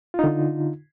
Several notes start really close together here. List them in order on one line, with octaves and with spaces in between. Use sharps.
F4 D#4 D3